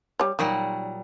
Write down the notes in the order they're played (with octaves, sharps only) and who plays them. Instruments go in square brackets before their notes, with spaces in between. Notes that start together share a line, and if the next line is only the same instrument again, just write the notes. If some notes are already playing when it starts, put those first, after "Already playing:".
[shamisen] G3 C#5
[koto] A#2 F#3 G3 [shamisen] D#3